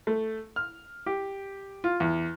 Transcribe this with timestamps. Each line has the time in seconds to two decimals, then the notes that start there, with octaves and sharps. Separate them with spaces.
0.07 A3
0.56 F6
1.06 G4
1.84 F4
2.00 E2